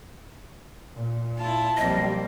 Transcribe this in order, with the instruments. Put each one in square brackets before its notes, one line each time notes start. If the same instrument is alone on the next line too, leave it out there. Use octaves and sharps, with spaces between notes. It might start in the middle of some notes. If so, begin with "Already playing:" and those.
[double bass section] A#2
[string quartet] E4 F4 A5
[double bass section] B1 G3 A#3 [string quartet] F3 C4 [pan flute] D#5